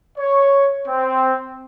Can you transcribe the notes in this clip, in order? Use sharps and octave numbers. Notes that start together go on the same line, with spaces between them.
C#5
C4